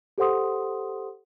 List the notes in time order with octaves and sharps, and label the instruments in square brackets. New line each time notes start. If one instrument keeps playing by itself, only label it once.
[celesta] G4 A4 C5 F#5 C6 D#6